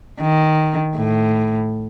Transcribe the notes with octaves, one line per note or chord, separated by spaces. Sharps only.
D#3
A2